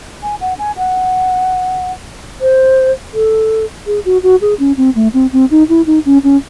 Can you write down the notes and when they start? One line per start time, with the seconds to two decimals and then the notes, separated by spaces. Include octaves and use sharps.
0.23 G#5
0.41 F#5
0.59 G#5
0.77 F#5
2.41 C5
3.14 A4
3.87 G#4
4.05 F#4
4.23 F#4
4.41 G#4
4.59 C#4
4.77 C4
4.95 A3
5.14 C4
5.32 C4
5.51 D#4
5.69 E4
5.86 D#4
6.05 C#4
6.24 C#4